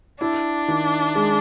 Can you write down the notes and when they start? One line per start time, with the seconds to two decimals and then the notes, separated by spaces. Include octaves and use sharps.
0.20 D4 E4
0.68 D#3
1.15 G#3